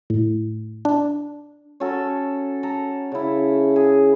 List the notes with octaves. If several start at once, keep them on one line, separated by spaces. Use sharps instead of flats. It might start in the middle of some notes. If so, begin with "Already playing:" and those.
A2
D4
C#4 F#4 A4 A#4
A4 A5 A#5
C#3 E4
G#4